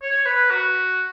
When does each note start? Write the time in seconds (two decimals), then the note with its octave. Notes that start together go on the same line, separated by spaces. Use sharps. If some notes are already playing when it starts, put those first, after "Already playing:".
0.02 C#5
0.26 B4
0.50 F#4